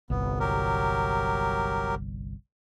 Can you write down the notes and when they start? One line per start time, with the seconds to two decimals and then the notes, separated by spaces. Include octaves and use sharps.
0.10 G1 C2 B3
0.40 F#3 G4 A#4